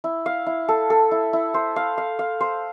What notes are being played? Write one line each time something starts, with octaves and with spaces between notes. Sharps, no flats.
E4
F5
E4
A4
A4
E4
E4
C5
F5
F5
F5
C5